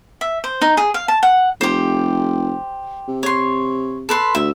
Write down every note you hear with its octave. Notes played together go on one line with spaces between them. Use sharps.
E5
C5
D#4
G#4
F5
A5
F#5
F1 G4 C5
C3
C#5 C6
A4 B4 C6
D2 E5